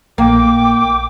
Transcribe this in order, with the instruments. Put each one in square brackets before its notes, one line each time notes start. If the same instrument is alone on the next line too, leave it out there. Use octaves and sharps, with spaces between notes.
[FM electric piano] A#1 [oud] A#3 [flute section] G5 D6